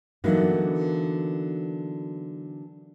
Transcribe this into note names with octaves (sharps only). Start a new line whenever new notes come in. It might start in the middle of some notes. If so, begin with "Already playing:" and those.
D3 E3 F#3 A#3 B3 D#4